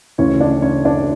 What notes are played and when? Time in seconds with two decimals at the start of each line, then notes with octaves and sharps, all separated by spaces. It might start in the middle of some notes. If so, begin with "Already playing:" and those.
0.18 D2 C#3 E3 C#4 C#5
0.41 D4 D5
0.62 C#4 C#5
0.85 D4 D5